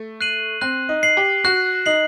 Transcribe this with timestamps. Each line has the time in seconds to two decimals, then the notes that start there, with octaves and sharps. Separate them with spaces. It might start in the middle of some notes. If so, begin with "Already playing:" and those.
Already playing: A3
0.21 F#6 C7 D#7 F#7
0.61 C4 F#6
0.89 D#4
1.03 C7 F#7
1.17 G4
1.44 F#4 F#6
1.86 D#4 C7 F#7